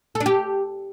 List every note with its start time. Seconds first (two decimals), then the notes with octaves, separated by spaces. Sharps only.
0.15 A4
0.21 D4
0.26 G4